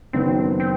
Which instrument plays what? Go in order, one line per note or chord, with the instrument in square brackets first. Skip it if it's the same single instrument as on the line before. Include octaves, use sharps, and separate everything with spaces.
[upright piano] F#1 F#2 D#3 F#3 B3 [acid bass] C4
[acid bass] C4